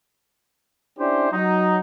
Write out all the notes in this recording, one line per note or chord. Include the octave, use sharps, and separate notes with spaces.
C#4 D4 E4 G4 C5
F#3 D#4